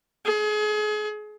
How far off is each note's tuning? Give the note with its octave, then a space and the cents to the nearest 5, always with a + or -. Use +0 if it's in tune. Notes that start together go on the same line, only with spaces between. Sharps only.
G#4 +35